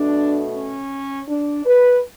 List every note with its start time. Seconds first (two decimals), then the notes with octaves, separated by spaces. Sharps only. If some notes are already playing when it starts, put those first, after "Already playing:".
Already playing: B2 A3 D4
0.52 C#4
1.28 D4
1.65 B4